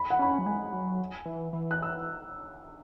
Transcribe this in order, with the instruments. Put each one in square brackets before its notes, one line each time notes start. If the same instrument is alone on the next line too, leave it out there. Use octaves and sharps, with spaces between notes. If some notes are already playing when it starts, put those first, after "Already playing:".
Already playing: [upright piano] B5
F#5
[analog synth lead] C#4 [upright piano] B5
[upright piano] G#5
[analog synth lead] F#3
[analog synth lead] G#3 [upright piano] G#5
[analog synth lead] F#3
E3
E3
[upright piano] F#6
E6